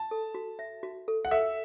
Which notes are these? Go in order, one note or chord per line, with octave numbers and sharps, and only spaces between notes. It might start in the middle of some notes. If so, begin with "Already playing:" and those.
Already playing: A5
A4
F#4
E5
F#4
A4
F#5
A4 E5